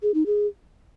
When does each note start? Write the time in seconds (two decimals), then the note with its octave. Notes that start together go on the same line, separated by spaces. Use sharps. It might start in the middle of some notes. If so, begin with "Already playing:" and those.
0.02 G#4
0.14 D#4
0.26 G#4